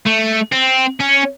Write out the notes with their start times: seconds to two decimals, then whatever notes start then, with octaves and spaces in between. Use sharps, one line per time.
0.06 A3
0.52 C4
1.00 C#4